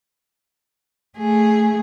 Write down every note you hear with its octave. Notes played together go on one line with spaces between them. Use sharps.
A3 G#4